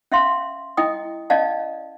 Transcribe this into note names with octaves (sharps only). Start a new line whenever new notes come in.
C#4 E5 F5 C6
E4 D#5 G5 D#6
C#4 D5 D#5 F5 A5